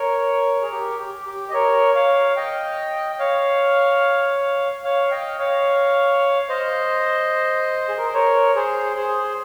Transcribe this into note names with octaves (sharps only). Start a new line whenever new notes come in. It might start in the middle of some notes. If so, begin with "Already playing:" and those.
Already playing: A#4 C#5
G#4
G4 A#4
G4
G4
D#5
A#4 C#5
C#5 F5
D#5 G5
C#5 F5
C#5 F5
D#5 G5
C#5 F5
C5 D#5
G#4
A#4
C5
A#4 C#5
G#4 C5
G#4 C5